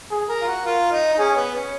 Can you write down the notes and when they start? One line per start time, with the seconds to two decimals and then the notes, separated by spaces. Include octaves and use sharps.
0.11 G#4
0.29 A#4
0.42 F4
0.48 F#4
0.65 F4 A#4
0.92 D#4
1.14 D#4
1.18 C#4 G#4
1.36 B3
1.55 C#4